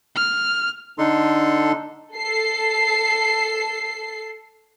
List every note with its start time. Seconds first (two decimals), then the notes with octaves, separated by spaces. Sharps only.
0.16 F6
0.98 D3 D4 D#4 A4 C6
2.13 A4 C7